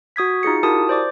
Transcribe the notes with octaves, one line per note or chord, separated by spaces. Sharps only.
F#4 D#6 G#6 B6
D#4 F4 G#4 C#7
E4 F#4 G4 A#4 A5 D#6
C5 D5 D6